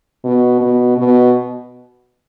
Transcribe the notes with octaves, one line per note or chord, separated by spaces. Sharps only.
B2
B2
B2